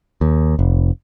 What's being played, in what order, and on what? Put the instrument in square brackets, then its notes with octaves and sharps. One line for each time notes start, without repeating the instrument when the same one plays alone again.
[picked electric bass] D#2
F1